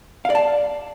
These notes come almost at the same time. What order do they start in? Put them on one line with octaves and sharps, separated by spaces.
F5 D5 A5